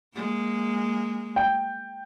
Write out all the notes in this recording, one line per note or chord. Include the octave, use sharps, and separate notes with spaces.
G#3 A#3
G5